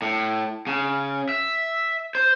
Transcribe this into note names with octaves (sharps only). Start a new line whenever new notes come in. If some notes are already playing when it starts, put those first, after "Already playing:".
A2
C#3
E5
C5